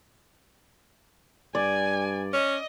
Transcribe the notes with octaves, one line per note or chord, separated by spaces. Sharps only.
G2 D5 G#5
C#4 D#5